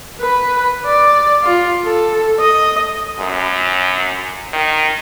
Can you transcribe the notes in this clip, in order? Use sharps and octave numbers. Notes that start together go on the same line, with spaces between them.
B4
D5
F4
A4
D#5
F#2
D#3